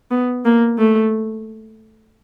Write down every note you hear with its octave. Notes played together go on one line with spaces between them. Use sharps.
B3
A#3
A3